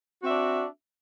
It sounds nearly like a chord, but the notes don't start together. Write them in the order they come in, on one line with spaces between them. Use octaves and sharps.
F#4 C4 E5 D4